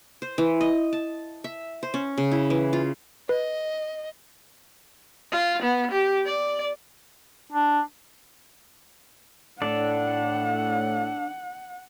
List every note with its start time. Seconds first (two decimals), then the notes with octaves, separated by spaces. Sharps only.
0.22 C5
0.38 E3
0.61 D#5
0.93 A5
1.44 E5
1.83 C5
1.94 C#4
2.18 C#3
2.31 E4
2.50 E3
2.73 F4
3.29 B4 D#5
5.32 F4
5.62 B3
5.91 G4
6.25 D5
7.52 D4
9.62 A2 D4 A4 D5 F#5